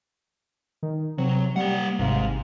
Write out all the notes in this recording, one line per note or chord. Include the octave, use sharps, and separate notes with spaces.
D#3
C3 F#3
G3 A#3 F#5
G#1 G#2 C3 F5